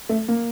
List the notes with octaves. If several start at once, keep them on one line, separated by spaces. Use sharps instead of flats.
A3
A#3